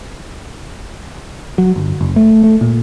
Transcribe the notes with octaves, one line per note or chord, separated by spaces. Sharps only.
F#3
G1
F#1
A3
A3
A#2